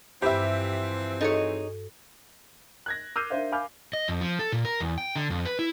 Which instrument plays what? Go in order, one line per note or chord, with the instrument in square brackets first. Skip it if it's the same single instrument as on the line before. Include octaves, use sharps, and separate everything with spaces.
[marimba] G2 B5 [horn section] E3 F3 C4 [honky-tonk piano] G4 E5
[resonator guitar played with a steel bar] D#4 G#4 C#5 [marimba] F#4 A4
[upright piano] F#6 G#6 A#6
D6 E6 F6 G6 C7 D#7
D4 A#4 C5 E5 F5
F5 G#5 B5 D6 F6 G6
[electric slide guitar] D#5
F2
F3
A4
A#2
A#4
E2
G5
D3
F2
B4
E4